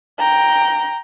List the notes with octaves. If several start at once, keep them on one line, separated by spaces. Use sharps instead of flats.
G5 A#5